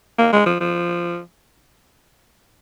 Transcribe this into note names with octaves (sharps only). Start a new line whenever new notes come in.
A#3
G#3
F3
F3